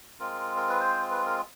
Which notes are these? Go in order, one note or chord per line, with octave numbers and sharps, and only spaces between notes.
G#3 C4 F4 A#4
A#4
B4
C5
B4
A#4